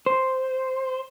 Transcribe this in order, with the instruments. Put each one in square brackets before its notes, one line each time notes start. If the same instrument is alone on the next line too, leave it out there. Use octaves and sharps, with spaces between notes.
[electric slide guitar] C5